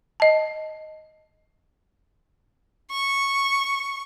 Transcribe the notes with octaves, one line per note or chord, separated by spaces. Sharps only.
D#5 A5
C#6